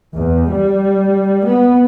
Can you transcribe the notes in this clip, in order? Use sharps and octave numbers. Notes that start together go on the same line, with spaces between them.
E2
G3
B3